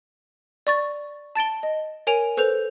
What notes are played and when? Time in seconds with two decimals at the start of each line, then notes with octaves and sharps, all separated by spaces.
0.67 D5 C#6 A6
1.35 A5 A6 D7 G7
1.63 D#5
2.07 A#4 C#5 G#5 D7 F7
2.37 A4 B4 C5 G6 F7